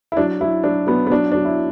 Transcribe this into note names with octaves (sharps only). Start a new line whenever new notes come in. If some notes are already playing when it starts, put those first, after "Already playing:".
E4
F#3 D4
F#3 E4
F#3 D4
F#3 B3
B3
F#3 D4
F#3 D4
E4